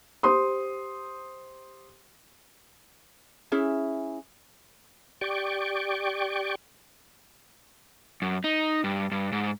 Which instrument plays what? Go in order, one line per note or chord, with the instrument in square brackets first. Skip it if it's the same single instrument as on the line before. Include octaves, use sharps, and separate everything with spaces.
[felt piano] G4 C5 C6 D#6
[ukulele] C#4 E4 G#4 E5
[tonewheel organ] G4 D5 G5 C#6
[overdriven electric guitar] F#2
D#4
G2
G2
G#2